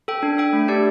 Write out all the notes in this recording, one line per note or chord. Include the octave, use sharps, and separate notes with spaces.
A4 G5
D4
A4 G5
A3
D4 G4 D5 A5